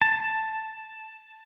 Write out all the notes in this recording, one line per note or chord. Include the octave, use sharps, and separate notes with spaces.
A5